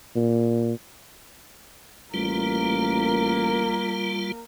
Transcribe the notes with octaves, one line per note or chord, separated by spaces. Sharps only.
A#2
A1 G3 A#3 F4 A#4